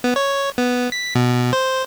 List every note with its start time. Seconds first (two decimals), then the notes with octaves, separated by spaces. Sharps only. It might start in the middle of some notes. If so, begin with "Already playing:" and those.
0.04 B3
0.16 C#5
0.58 B3
0.92 B6
1.15 B2
1.53 C5